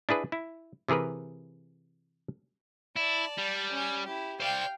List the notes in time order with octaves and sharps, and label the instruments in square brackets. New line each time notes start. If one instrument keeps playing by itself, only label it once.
[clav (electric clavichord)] D4 E4 G#4 B4
E4
C3 E3 G#4 A#4 B4
[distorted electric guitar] E4 [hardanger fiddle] D5 A5
[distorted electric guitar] G3
[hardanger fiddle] C#4 G#5
E4 G4
[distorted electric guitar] C5 D5 [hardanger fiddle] F5 G5